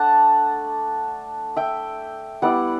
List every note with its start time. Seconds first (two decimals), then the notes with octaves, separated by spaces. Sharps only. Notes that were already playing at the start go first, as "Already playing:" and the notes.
Already playing: A3 D4 F#5 A5
1.56 E5 G5
2.42 G3 B3 E4 D5 F#5